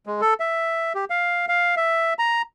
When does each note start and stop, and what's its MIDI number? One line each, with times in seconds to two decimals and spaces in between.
0.06 0.21 56
0.21 0.34 69
0.40 0.93 76
0.95 1.05 67
1.10 1.46 77
1.48 1.75 77
1.77 2.14 76
2.19 2.42 82